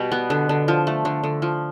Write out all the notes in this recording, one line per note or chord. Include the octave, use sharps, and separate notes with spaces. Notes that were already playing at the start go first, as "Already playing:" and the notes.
Already playing: B2 G3
B3
D3
D3
F3
A3
D3
D3
F3